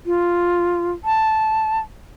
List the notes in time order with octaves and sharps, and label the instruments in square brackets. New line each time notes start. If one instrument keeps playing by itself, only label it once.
[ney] F4
A5